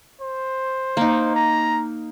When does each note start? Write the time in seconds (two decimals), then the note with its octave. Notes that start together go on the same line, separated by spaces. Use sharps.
0.21 C5
0.97 A#3 D#4
1.36 A#5